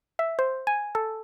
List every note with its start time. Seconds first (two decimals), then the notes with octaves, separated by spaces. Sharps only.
0.19 E5
0.39 C5
0.67 G#5
0.95 A4